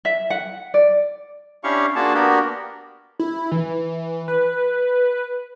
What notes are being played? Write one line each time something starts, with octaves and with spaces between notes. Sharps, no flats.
E5
F#5
D5
C#4 D4 E4 G4 F5 C#6
A#3 D4 F4 F#4 G#4 A5
A#3 B3 D4 F#4 G4 A#4
E4
E3
B4